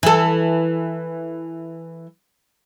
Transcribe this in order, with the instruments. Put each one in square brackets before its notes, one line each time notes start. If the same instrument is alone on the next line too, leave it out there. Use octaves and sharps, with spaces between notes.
[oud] E3 A4